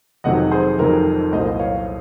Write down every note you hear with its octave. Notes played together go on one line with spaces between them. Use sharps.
F1 F2 C3 D#3 F#3 D#5 F#5
G#4 C5
F1 F2 C3 D#3 F#3 A#4
C2 A#2 F#3 A#3 C5 D#5
C#5 F5